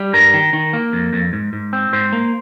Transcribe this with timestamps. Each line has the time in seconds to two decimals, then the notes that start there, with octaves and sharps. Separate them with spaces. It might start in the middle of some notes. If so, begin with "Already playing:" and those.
Already playing: G3
0.13 G2 A#4
0.34 D#3
0.53 D#3
0.73 A#3
0.93 F2
1.13 F2
1.33 G#2
1.53 G#2
1.73 C4
1.93 G#2 C5
2.13 A#3